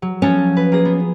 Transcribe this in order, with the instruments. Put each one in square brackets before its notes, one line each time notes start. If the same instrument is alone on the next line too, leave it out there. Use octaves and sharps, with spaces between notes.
[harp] F#3
[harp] F3 F#4 A4 [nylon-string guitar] C#4
[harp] B4
A#3 G#4 A#6
B3